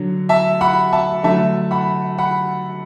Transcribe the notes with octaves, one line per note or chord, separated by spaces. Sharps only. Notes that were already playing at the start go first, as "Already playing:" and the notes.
Already playing: D3 F#3
E5 A5
F#5 B5
E5 A5
D3 F#3 A3 E5 A5
F#5 B5
F#5 B5